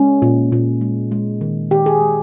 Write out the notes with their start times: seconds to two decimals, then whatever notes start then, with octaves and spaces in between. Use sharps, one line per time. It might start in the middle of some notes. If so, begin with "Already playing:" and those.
Already playing: G#3 C#4
0.22 A#2
0.52 A#2
0.81 G#3
1.12 G#3
1.41 D#3
1.71 D#3 G4
1.86 G#4
2.01 G#3